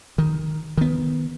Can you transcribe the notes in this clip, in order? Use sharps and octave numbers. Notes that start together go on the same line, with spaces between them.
D#3
D#3 B3